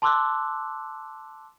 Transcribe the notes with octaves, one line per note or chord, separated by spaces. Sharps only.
A5 C6 D6 E6 F#6